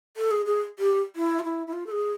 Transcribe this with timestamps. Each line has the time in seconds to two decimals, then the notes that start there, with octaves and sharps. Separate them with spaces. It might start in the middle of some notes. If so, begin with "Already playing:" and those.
0.17 A4
0.31 G#4
0.46 G#4
0.79 G4
1.16 E4
1.39 F4
1.44 E4
1.67 E4
1.73 F4
1.86 A4
1.91 G#4